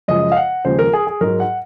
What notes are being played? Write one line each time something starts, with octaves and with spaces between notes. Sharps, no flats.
F#2 C#3 F3 G#3 D#5
F5
F#5
D#2 C#3 F3 G#3 C5
A#4
G#4
G#4
G#2 F#3 A#4
F#5